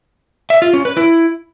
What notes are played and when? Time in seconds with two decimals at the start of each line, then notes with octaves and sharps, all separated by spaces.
0.50 E5
0.62 F4
0.73 C#4
0.85 B4
0.97 E4